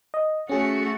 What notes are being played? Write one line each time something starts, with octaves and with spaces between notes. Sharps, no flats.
D#5
A3 C#4 F#4 G#4